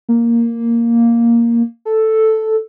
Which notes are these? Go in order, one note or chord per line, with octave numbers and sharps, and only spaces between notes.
A#3
A4